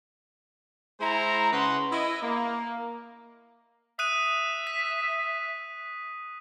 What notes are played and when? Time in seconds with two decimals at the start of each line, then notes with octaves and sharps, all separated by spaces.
1.01 G#3 E4 C5 A#5
1.53 C#3 B4 F#5 C6
1.92 E4 D#5
2.23 A#3
3.99 E5 D#6 F#6 D#7
4.67 B6